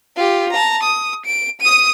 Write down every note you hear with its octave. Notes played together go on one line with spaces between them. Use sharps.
F4 G4
A5 A#5
D#6
D7
D#6 D#7